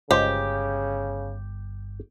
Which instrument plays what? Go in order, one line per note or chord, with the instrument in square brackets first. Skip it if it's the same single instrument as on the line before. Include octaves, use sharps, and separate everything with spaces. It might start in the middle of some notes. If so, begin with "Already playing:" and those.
[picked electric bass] G1 [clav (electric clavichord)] C#2 C5 D#5 [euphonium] C#3 [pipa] G4